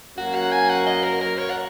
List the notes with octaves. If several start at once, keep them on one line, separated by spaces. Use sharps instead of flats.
F#2 F#3 A#3 F#4
F#5
G#5
F#5
D#5
A#4
A#4
C#5
F#5